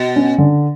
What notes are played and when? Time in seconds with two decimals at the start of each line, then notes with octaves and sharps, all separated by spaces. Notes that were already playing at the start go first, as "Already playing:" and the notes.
Already playing: B2
0.16 C#4
0.38 D3